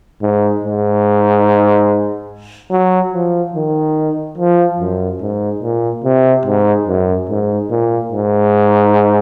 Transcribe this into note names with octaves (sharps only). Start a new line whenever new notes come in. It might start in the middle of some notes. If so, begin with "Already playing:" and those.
G#2
G#2
F#3
F3
D#3
F3
F#2
G#2
A#2
C3
G#2
F#2
G#2
A#2
G#2